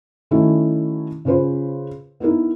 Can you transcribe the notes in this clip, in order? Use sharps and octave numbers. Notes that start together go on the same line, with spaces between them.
D#3 A3 C#4 E4 F#4
C#3 C#4 F4 B4 C5
B3 D#4 E4 A#4